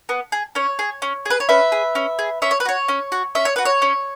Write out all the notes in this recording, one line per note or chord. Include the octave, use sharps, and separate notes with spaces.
B3
G#4
C#4 C#5
G#4
C#4
G#4 B4
C#5
C#4 B4 E5
G#4
C#4
G#4
C#4 E5
C#5
B4
F#4 C#5
C#4
F#4
C#4 E5
C#5
F#4 B4
C#5
C#4